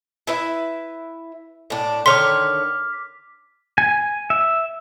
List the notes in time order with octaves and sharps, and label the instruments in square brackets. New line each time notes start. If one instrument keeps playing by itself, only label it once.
[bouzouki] E4 B4 E5
A2 D4
[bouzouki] D3 D#3 C#5 [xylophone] C6 [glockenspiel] D6 F6 B6
[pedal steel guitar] G#5
E5